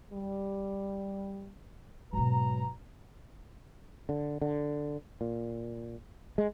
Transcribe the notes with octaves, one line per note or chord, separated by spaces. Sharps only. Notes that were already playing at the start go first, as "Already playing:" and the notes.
G3
G#2 B2 F#3 B4 A#5
D3
D3
A#2
G#3